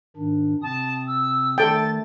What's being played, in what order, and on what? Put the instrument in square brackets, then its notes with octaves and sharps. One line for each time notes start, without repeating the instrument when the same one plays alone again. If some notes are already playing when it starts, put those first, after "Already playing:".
[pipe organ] G#2 D#3 D4
[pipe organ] C3 C4 D#6 [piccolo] A5
[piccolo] E6
[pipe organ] D#3 A3 [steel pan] A4 G5 [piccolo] A6